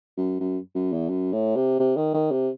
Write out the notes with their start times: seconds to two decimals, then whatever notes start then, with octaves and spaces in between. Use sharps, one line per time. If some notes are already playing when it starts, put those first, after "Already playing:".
0.17 F#2
0.40 F#2
0.75 F#2
0.93 E2
1.10 F#2
1.33 A2
1.56 C3
1.79 C3
1.97 D#3
2.14 D#3
2.31 C3